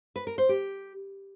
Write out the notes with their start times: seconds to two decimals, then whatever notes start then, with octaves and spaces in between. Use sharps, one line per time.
0.16 B4
0.27 A#4
0.38 C5
0.49 G4